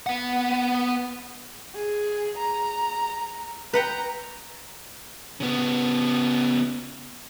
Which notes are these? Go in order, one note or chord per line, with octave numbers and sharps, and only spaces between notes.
B3 F#5
G#4
A#5
B4 F#5 G5 A#5
C#3 B3